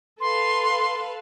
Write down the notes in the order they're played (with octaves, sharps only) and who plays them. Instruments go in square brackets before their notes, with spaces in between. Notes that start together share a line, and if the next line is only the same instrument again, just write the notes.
[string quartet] A4 B4 F5 [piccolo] C6